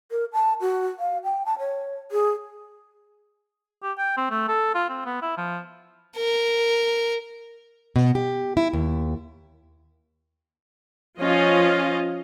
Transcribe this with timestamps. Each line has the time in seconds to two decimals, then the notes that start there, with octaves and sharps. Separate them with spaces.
0.11 A#4
0.33 A5
0.61 F#4
0.99 F5
1.24 G5
1.46 A5
1.59 C#5
2.11 G#4
3.83 G4
3.98 G5
4.17 C4
4.31 A3
4.48 A4
4.75 F4
4.89 C4
5.05 B3
5.22 E4
5.38 F3
6.17 A#4
7.96 B2
8.15 G4
8.57 E4
8.73 D#2
11.20 F3 C#4 F4 D#5 F5